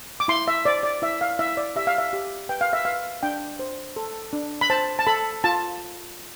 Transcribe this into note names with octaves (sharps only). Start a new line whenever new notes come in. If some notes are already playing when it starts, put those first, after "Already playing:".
D6
E4 C6
E5
C5 D5
D5
E4 E5
F5
E4 E5
D5
G4 E5
F5
E5
G4
B4 G5
F5
E5
B4 F5
D4 G5
C5
A4
D4
B5
C5 A5
A5
A4 B5
F4 A5